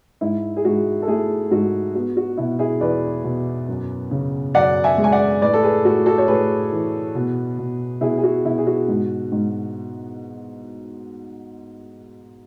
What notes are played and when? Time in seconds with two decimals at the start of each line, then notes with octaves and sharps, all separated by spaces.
0.21 G#2 E4
0.57 G#4
0.65 G#2 F#4
1.02 A4
1.08 A3 E4 G#4
1.51 G#2 F#4
1.94 B3 F#4
2.17 F#4
2.37 B2 E4
2.59 E4 G#4
2.81 E2 B4 D5
3.24 B2
3.68 F#2
4.11 C#3
4.55 F#2 D5 F#5
4.84 E5 G#5
4.98 G#3
5.04 G#5
5.12 D5 F#5
5.41 A2 B4 D5
5.54 A4
5.63 G#4 B4
5.85 A2 F#4
6.06 F#4 A4
6.18 C#5
6.28 A2 G#4 B4
6.72 E3
7.15 B2
7.58 B2
8.01 B2 E4 G#4
8.18 G#4
8.24 F#4
8.45 B2 E4
8.58 G#4
8.67 F#4
8.88 G#2
9.32 G#2